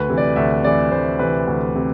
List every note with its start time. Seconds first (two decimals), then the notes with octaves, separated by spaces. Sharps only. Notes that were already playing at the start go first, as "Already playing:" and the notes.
Already playing: D2 B4
0.09 C3 E3
0.18 D5
0.36 D2 E5
0.64 C3 E3 D5
0.91 D2 C5
1.19 C3 E3 B4
1.48 D2
1.75 C3